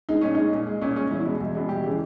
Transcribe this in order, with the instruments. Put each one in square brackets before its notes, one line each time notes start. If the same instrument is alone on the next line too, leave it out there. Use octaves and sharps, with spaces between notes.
[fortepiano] G#3 D#4
A#2 C#4
G#3 D#4
A#2
G#3
A#2 C#4
G#3 C#4
E2 E4
B2 G#3
E2
B2 G#3
E2 G4
C#3 E3 G#3